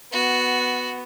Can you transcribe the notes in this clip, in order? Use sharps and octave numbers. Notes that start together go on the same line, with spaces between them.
B3 F#4